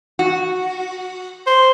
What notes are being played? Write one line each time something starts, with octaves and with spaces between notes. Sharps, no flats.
F#4
C5